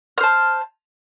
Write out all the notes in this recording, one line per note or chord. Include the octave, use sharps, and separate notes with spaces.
C5 A5 F6